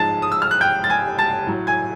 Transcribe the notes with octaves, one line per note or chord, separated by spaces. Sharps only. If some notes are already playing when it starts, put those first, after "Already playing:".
Already playing: G#2 F3 G#3 A5 A6
D#6
E6
F6
F#6
G5 G6
A6
G#5 G#6
A5 A6
A2 F#3
G#5 G#6